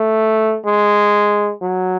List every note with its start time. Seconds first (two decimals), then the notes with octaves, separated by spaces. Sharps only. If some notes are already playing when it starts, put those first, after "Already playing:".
Already playing: A3
0.66 G#3
1.62 F#3